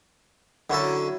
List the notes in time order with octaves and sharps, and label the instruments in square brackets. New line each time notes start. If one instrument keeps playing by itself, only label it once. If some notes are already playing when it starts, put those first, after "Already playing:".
[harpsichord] D3 C#4 A4 [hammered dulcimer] F#3 E4